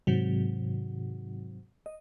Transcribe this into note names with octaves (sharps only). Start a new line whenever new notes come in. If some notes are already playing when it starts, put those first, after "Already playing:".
G#2 C3 D#3 F#3
D#5